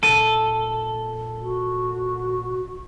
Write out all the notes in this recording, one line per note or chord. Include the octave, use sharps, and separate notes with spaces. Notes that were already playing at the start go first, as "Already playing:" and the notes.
A#2 A4 D#7
F#4